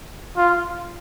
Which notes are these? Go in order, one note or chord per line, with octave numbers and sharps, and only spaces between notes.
F4